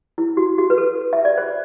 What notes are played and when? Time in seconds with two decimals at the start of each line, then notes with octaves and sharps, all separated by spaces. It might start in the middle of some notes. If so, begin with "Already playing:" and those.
0.18 E4
0.37 F#4
0.58 F#4
0.70 B4
0.78 A4
1.13 E5
1.25 D5
1.38 C5